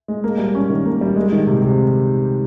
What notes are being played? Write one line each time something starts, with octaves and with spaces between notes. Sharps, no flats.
G#3
A#3
G3
C#4
D#3
A#3
G3
G#3
D#3
C3
C3